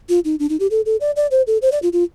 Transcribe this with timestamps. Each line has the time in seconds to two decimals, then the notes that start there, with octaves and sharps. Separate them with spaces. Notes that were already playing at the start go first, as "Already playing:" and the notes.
0.09 F4
0.25 D#4
0.39 D4
0.49 D#4
0.60 G4
0.71 A4
0.86 A4
1.00 D5
1.16 D5
1.31 C5
1.47 A4
1.62 C5
1.72 D5
1.82 F4
1.93 F4